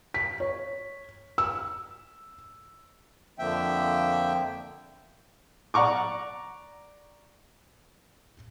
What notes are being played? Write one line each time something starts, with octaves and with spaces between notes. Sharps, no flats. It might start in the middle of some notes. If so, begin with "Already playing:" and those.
B6
C#5
E6
F2 D3 F3 A#3 E5 G5
D5 F#5 A#5 C#6 D6